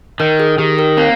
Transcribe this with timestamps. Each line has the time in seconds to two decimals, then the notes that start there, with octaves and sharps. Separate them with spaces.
0.20 D#3 A#4
0.40 G#4
0.58 D#3 G4
0.79 A#4
0.97 A#3 C4